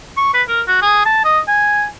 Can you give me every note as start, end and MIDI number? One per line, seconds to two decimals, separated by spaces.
0.17 0.31 85
0.34 0.43 71
0.48 0.61 70
0.68 0.78 66
0.82 1.05 68
1.06 1.21 81
1.25 1.40 75
1.48 1.86 80